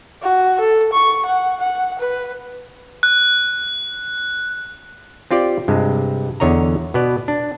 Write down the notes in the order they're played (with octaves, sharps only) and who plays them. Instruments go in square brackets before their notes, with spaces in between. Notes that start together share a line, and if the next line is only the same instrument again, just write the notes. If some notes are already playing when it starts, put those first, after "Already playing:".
[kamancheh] F#4
A4
C#6
F#5
F#5
B4
[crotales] F#6
[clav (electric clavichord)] C4 F4 G4 D5
G2 C3 G#3
E2 D3 C#5 D#5 A#5
B2 B3 D5
D4